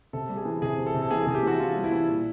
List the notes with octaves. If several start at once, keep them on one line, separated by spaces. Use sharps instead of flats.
C3 A4
G3
G#4
E3
C3 G#4
C3
A4
C3
A4
E3 G#4
C3 G#4
G4
E3 F#4
E3 F4
G3
E4
E3
A#2